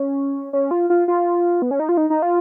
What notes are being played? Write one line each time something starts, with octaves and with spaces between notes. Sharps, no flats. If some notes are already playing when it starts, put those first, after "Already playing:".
Already playing: C#4
C#4
F4
F4
F4
B3
C#4
D#4
F4
D#4
D#4
F4